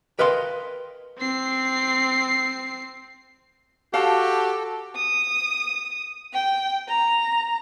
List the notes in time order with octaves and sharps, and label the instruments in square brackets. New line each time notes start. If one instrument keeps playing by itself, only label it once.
[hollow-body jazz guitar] A#4 B4 D#5 F5 G5 C6
[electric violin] C4 C7
[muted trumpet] F#4 [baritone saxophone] G4 [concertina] A4 [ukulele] F5 A5
[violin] D#6
G5
A#5